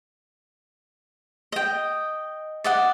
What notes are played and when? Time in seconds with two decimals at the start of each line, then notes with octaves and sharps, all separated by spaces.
1.52 D#5 G5
2.64 D5 D#5 F#5